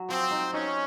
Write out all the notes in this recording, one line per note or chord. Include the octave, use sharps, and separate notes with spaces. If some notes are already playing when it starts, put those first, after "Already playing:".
Already playing: F#3
F3 C4
D#4
C#4 D#4